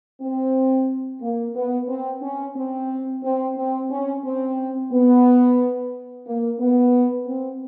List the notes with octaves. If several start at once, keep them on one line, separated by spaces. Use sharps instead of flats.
C4
A#3
B3
C4
C#4
C4
C4
C4
C#4
C4
B3
A#3
B3
C4